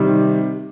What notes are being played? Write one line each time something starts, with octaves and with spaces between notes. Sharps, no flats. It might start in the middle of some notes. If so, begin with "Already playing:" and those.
Already playing: C3 D#3 G3